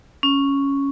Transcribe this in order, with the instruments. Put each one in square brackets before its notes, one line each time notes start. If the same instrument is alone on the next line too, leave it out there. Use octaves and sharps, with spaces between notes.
[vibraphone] C#4